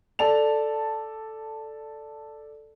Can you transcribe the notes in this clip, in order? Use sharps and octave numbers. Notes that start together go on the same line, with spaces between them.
A4 D5 A5 F7